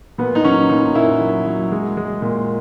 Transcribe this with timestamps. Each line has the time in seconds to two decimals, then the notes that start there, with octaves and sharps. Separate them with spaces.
0.18 A#2 B3
0.35 D#4
0.44 F#3 C#4
0.69 A#2 D#4
0.95 A#2 E4
1.20 F#3
1.46 F#3
1.72 G#3
1.97 G#3
2.22 A#2